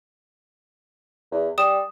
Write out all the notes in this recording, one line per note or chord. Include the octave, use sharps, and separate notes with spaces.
E2
G3 D#6 E7